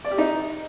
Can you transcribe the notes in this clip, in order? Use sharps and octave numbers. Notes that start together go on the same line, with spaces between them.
D5
G4
D#4